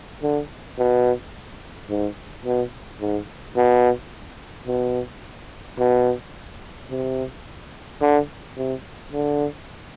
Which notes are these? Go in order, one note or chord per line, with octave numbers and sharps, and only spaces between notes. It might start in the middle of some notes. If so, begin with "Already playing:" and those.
D3
B2
G#2
B2
G#2
B2
B2
B2
C3
D3
C3
D3